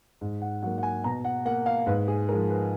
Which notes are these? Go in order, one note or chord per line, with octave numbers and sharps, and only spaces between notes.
G#2
F#5
F#3 A#3 F#5
F#5
G#5
B2 A#5
F#5
A#3 F#5
F5
G#2 B4
G#4
F3 G#3 A#4
B4